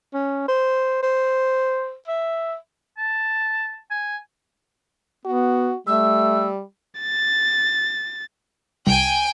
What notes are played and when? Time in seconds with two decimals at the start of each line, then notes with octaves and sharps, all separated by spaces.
0.14 C#4
0.48 C5
1.03 C5
2.08 E5
2.98 A5
3.91 G#5
5.26 B3 F#4
5.87 G3 A3 E6
7.01 A6
8.87 C2 G5 G#5